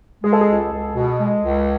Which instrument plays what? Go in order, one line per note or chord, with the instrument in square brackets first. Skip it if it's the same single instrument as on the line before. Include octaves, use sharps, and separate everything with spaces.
[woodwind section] G#3 [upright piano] G#4
[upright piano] A4
G#4
[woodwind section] C#2
C#2
B2
G#3
C#2